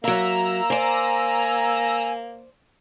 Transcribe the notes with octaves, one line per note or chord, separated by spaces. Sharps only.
F#3 A#3 E5 A#5 E6
C5 D5 G#5